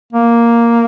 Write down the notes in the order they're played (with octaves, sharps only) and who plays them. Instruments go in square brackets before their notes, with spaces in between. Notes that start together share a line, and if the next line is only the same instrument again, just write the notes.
[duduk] A#3